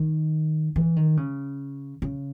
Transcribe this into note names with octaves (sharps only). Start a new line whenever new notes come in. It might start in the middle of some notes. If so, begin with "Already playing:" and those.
Already playing: D#3
E3
D#3
C#3
C#3